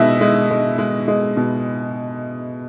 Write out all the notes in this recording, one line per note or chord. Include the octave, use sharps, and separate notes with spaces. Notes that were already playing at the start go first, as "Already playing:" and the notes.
Already playing: B2 G#3 D#5 E5
G#3
G#3
G#3
G#3
B2